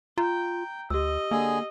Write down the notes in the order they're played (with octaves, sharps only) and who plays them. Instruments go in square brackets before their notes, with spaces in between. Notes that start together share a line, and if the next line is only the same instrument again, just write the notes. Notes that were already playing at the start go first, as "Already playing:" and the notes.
[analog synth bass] F4 [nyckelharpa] G5 [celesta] A#5
[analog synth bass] D2 [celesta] G4 E6 [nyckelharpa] D#5
[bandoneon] D3 G#4 [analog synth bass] A#3